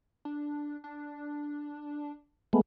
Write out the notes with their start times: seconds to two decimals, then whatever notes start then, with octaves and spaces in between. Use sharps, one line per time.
0.25 D4
0.84 D4
2.53 G#3 A3 B3